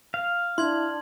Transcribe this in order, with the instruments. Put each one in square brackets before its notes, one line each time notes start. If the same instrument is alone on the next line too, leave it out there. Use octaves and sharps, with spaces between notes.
[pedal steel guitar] F5
[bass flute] D4 [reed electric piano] E4 [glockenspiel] C6 G#6 F#7